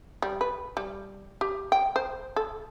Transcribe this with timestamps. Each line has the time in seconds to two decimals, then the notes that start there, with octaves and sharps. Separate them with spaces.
0.22 G3
0.41 B4
0.77 G3
1.41 G4
1.72 G5
1.96 C5
2.36 A4